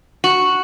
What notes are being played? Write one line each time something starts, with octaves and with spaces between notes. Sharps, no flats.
F#4